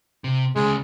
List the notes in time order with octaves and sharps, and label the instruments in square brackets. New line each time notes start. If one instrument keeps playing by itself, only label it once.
[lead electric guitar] C3
[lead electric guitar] D2 C#3 [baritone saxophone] G#3